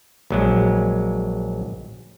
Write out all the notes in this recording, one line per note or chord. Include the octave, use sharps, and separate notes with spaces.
A#1 F#3 G#3